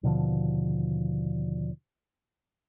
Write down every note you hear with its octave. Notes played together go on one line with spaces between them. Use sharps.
D#2 B2 D3 F3